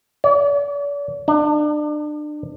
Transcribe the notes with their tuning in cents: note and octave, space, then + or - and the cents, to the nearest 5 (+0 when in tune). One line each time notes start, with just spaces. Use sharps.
D5 -45
D4 +35